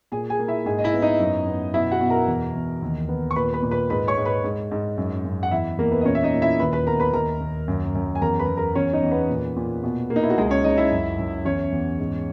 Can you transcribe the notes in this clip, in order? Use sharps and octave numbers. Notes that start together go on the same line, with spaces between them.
A#2 G#4 G#5
G#4 G#5
A#3
E4 E5
G#2 G#4 G#5
D#5
E4 E5
B3
D#4 D#5
F#2
B3
B2 E4 E5
F#4 F#5
B2
A#4 A#5
E2
E2
D#2
B3
C#6
A#2 B4 B5
B4 B5
A#2
B4 B5
G#2 B4 B5
C#5 C#6
G#2
B4 B5
G#2
G#2
F#2
F#2
F#5
E2 E4 E5
E2 A#3 A#4
B3 B4
D#5
A#2 C#4 C#5
E5
D#4 D#5
A#2
E4 E5
D#2 B4 B5
B4 B5
B3 A#4 A#5
B4 B5
D#2 A#4 A#5
D#2
F#2
F#2
G#5
E2 A#4 A#5
B4 B5
E2
A#4 A#5
E2 C#4 C#5
D#4 D#5
E2
B3 B4
A#2
A#2
B2
A#3
D#4
E4
F#4
C#2 G#3 G#4
C#4 C#5
C#2 D#4 D#5
E4 E5
F#2
F#2
E2 C#4 C#5
E2
G#2